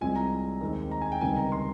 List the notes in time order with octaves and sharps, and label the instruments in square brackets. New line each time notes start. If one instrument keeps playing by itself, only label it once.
[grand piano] C2 C3 F3 G#3 C4 G#5
A#5
D#2 D#3 G#3 C4
A#5
G#5
G5
C#2 C3 D#3 G3 C4 G#5
A#5
C6